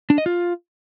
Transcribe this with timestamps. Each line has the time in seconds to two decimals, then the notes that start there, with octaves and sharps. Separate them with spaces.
0.10 D4
0.18 D#5
0.26 F4